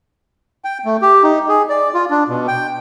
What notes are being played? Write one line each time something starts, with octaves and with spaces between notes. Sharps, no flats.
G5
A3
G4
D#4
G#4
D5
F4
D4
B2
G5